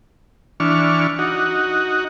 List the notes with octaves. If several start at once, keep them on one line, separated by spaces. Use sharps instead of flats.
E3 D4 C#6 F6
D#4 F#4